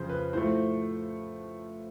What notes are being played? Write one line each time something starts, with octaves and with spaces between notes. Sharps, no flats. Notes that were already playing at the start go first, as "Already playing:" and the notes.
Already playing: F2 C#3 F3 C5
B4
A2 F3 A3 C5